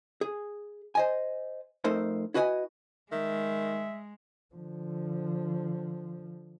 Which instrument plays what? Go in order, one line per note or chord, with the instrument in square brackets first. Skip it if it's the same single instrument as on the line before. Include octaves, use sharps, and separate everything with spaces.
[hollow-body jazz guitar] G#4
C5 D#5 G#5
F2 A3 D#4 A4 A#4 C5
E4 F#4 B4 D#5 F5 G#5
[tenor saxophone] D#3 [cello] G#3 [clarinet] E5
[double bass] D3 F3